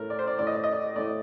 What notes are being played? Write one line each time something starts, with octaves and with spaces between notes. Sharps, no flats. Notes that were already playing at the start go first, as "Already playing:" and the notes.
Already playing: A2 A3 A#4
D5
C5
D5
A2 A3 D5
D#5
D5
D#5
D5
A2 A3 D5